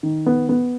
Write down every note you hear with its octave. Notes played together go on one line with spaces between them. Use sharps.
D#3
B3
B3